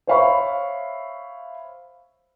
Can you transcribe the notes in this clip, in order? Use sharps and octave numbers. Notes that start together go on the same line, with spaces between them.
C5 C#5 E5 F5 B5 C#6